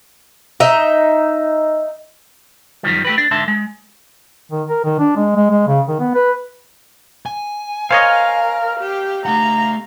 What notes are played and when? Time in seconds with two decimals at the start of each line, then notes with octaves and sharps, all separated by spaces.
0.60 D#4 E5
2.83 F#2 D#3 F3 G3
3.05 A3 G4 B4
3.18 D4
3.31 G#2 D3 E5 A5 C6
3.48 G#3
4.52 D#3
4.69 A#4
4.84 D#3
4.99 D4
5.17 G#3
5.36 G#3
5.50 G#3
5.67 C#3
5.88 D#3
6.00 B3
6.15 B4
7.26 G#5
7.91 A#4 C5 C#5 D#5 F5
8.79 G4
9.26 A3 F#5 A#5